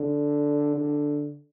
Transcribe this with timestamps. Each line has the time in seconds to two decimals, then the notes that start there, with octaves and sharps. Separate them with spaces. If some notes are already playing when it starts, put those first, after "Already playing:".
Already playing: D3
0.75 D3